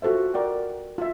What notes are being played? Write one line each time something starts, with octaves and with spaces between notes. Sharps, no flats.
F4 F#4 A4 C5 E5
A#4 D5 F#5 G5
F4 E5